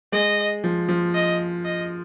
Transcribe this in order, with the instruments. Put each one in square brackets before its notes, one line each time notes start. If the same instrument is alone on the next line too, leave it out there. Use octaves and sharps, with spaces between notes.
[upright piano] G#3 [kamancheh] D#5
[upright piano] F3
F3
[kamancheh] D#5
D#5